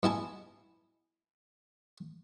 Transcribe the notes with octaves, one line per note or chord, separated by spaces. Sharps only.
B2 E4 G#5 A5